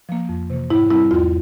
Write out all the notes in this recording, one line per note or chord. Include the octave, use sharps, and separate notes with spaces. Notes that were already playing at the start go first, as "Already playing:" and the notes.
F3 A#3
F2
C3 E3 A#3
G#2 E4
G3 C4 E4
E2 F4